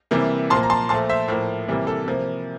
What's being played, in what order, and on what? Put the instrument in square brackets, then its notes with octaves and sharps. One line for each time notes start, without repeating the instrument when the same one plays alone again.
[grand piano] C3 E3 G3 A#3
A#2 F3 A#3 A5 C6
A#5
A5 C6
A#2 F3 A3 A5 C6
C5 E5
A2 F3 A#3
C3 E3 G3 A#3
A4
C3 F3 A#3